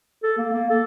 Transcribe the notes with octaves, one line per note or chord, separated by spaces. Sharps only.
A4
A#3
A#3
A4